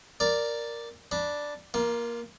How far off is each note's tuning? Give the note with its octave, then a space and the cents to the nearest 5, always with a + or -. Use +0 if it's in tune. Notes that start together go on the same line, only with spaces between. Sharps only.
A#4 +0 D5 +0
D4 +0 B5 -30
A#3 +15 F4 -20